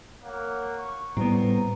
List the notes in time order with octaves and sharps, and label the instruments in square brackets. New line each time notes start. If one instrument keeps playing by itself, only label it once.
[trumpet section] A#3 C#5 F#5
C#6
[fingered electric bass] A2 G3 [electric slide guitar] B3 C4 [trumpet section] A#5